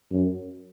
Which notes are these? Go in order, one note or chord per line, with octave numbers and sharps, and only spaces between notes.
F#2